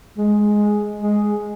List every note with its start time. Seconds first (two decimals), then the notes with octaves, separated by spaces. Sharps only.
0.18 G#3
1.02 G#3